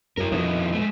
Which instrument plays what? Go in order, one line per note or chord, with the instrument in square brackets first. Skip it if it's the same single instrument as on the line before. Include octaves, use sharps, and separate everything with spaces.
[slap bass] F#2 [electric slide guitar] E4 A#4
[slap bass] F2 B2 [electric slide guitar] F3 D#4 E4
[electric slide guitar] G#3 A3